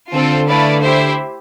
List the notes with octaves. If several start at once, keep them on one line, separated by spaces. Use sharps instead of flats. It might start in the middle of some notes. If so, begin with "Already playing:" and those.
D3 C4 F4 A4 C5 G5
A3 E4 B4 D5 F5
E4 G4 C5 E5